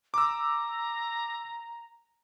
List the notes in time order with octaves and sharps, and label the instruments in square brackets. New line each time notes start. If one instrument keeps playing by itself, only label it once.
[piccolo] A#5 [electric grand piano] D6 E6